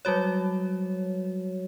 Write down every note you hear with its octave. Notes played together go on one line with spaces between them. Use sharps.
F#3 G3 F#4 C#5